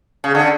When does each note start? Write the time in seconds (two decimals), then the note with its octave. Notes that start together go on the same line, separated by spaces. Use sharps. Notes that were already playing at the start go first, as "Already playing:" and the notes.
0.24 C#3
0.35 D3